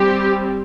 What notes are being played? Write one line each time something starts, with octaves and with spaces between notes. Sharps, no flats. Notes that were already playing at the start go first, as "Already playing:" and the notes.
Already playing: G3 C4 G4